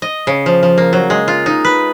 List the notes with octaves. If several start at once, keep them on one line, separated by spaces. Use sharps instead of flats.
D#5
C#3
F3
F3
A#3
F#3
G#3
F4
D#4
B4